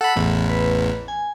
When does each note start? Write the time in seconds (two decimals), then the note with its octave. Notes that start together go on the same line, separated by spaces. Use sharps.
0.01 A4 F#5 B5
0.16 A1 E2 A2
0.49 B4
1.08 G#5